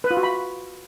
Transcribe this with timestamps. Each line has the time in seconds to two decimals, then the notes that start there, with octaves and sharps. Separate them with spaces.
0.04 B4
0.11 F4
0.17 F#4
0.23 B5